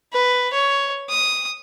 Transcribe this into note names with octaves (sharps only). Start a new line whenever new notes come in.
B4
C#5
D#6